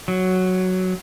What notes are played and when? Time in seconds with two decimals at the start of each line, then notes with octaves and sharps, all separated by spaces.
0.08 F#3